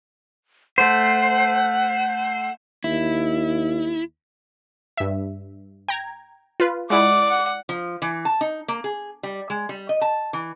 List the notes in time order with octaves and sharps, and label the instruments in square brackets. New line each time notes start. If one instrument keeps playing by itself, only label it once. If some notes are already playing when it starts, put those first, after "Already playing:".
[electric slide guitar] A3 C5 [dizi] F#5
[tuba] D#2 [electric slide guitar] E4
[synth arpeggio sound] G2 E5
G5 A#5 G#6
F4 B4
[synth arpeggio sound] G#3 E4 [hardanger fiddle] D5 F#5 [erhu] D6
[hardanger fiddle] F#5
[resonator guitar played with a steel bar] F3
E3
A5
D#4
A#3
G#4
G3
G#3
G3
D#5
A5
E3